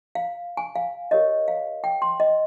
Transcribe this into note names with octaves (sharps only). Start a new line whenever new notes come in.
F5
G#5
F5
G4 A#4 C#5 D#5
F5
G5
C6
D#5